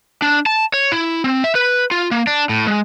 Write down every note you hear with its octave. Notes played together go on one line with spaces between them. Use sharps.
D4
A5
C#5
E4
C4
E5
B4
F4
A#3
D4
A2
G#3